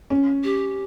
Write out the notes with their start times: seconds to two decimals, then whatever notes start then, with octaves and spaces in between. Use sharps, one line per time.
0.10 C#4
0.43 G4